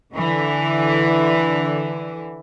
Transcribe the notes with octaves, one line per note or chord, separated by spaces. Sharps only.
D3 E3